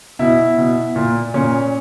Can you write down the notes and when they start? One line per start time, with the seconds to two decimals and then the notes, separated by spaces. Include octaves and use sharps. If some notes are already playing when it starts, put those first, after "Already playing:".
0.19 B2 E4
0.58 B2
0.96 A#2
1.34 A#2 C#4